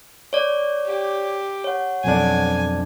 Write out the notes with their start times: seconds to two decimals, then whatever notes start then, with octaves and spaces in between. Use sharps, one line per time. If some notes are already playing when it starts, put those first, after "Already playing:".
0.33 C#5 D5
0.86 G4
1.64 C#5 F#5
2.04 B1 F2 D4 G#5